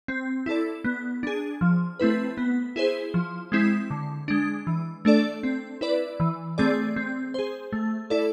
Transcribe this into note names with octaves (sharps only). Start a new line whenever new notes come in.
C4
E4 A4 D5
B3
D4 G#4
F3
A3 C4 E4 B4
B3
E4 G#4 C5
F3
G#3 C4 E4
D3
G#3 D4
E3
A3 D4 A4 D5
C4
E4 B4 D5
E3
A3 C4 G#4 D5
C4
G#4 C5
A3
E4 A4 D5